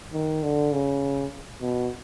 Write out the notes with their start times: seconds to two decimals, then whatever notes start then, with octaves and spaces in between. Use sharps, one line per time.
0.13 D#3
0.43 D3
0.73 C#3
1.62 B2